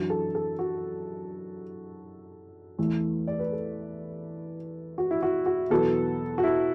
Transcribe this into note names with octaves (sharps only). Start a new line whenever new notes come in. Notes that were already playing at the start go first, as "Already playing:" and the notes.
Already playing: F#2 E3 D4 F#4
A4
A4
F#4
E2 E3 A3
D5
B4
A4
F#4
E4
F#4
F#4
E2 B2 F#3 B3 A4
F#4
E4